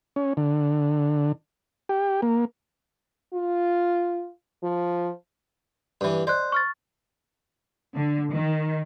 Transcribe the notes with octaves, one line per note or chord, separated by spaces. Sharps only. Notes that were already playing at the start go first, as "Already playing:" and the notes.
C#4
D3
G4
A#3
F4
F3
G2 E3
C5 D5 D#5 F#6
C#6 F6 A6
D3
D#3